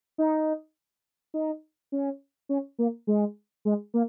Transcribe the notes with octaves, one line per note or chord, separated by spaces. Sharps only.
D#4
D#4
C#4
C#4
A#3
G#3
G#3
A#3